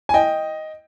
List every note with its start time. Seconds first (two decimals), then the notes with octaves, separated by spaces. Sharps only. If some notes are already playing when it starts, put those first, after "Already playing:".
0.09 G#5
0.14 D#5 G5